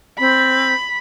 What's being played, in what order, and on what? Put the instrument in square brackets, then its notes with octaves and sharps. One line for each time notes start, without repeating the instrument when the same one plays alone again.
[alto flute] C4 [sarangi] B5